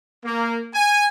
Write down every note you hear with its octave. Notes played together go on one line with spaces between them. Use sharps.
A#3
G#5